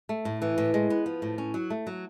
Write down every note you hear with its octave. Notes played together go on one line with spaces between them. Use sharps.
A3
A2
E3
A2
G#3
B3
F3
A2
C#4
F#3
A3
F#3